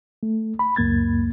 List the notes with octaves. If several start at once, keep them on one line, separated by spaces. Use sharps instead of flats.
A3
B5
C#2 F#2 A#3 G#6 A6